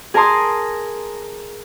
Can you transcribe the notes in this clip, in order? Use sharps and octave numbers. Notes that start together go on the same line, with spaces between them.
G#4 A#4 A5 A#5 C6 D#6